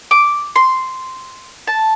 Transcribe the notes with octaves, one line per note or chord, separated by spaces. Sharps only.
D6
C6
A5